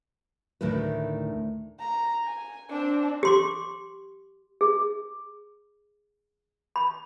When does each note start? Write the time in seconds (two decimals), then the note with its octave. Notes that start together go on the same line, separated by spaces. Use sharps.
0.61 D2 A2 D#3 E4 B4
1.80 A#5
2.24 G#5
2.70 C4 D4
3.23 G4 C6 D6
4.61 G#4
6.76 B5